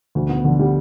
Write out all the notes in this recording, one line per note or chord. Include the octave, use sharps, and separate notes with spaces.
D2
B3
D3
G3